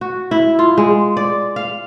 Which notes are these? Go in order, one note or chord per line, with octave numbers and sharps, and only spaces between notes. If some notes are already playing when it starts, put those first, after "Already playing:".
F#4
E4
F4
G#3
D5
F5